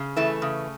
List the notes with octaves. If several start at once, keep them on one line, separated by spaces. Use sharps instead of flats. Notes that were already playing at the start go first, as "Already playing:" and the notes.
Already playing: C#3
E3 A3
C#3